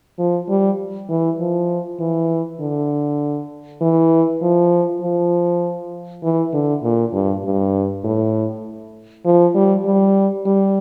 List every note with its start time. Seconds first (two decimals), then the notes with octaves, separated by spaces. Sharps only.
0.19 F3
0.49 G3
1.09 E3
1.40 F3
2.00 E3
2.60 D3
3.81 E3
4.42 F3
5.02 F3
6.23 E3
6.54 D3
6.83 A#2
7.13 G2
7.44 G2
8.04 A2
9.25 F3
9.55 G3
9.85 G3
10.46 G3